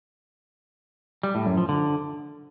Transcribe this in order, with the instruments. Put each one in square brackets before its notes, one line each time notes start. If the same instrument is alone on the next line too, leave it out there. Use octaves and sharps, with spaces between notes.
[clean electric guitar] G3
A2
F#2
F3
D3